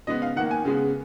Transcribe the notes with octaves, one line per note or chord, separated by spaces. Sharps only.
C#3 G#3 B3 D#5
F5
D#3 A#3 F#5
G#5
C#3 G#3 B3